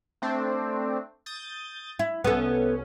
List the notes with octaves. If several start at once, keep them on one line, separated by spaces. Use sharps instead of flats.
A3 C4 D4
D#6 G6 A6
E4
C2 B3 C#4 A4